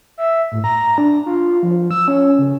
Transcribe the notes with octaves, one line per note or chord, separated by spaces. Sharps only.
E5
A2
A#5
D4
F4
F3
E6
C#4
C#3